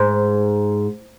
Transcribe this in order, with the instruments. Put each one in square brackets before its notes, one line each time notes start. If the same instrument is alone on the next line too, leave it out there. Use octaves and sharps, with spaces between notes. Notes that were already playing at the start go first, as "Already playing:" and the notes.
Already playing: [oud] G#2